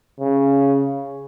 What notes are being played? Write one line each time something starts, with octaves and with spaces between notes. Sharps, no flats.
C#3